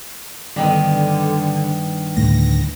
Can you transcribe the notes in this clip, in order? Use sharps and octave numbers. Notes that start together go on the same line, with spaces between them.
G2 D3 D#3 B3
D2 A2 A3 A#6